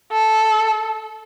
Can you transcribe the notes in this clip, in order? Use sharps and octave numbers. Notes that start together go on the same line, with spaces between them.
A4